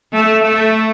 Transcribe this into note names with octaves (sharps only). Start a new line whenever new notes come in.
A3
A3